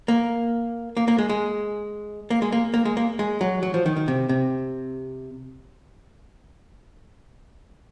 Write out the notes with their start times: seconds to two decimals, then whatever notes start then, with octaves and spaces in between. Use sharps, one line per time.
0.08 A#3
0.97 A#3
1.08 A#3
1.18 G#3
1.29 G#3
2.30 A#3
2.42 G#3
2.52 A#3
2.74 A#3
2.85 G#3
2.97 A#3
3.19 G#3
3.41 F#3
3.63 F#3
3.74 F3
3.86 D#3
3.96 D#3
4.08 C3
4.29 C3